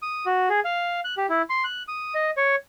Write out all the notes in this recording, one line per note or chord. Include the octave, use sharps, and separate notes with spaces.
D#6
F#4
G#4
F5
F#6
G4
E4
C6
F#6
D#6
D#5
C#5